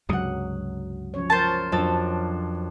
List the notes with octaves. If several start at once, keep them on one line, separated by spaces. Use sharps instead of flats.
C#2 G2 C3 F#3 F#5 D#6
F3 C#4 C#5
F3 A#4 C5 A5
F2 F#3 D4 A4 A6